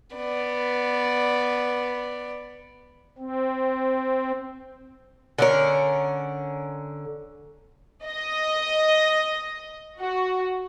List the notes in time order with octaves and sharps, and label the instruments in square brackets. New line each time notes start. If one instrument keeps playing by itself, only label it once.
[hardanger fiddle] B3 D5
[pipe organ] C4
[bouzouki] D3 C#4 A#4
[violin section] D#5
F#4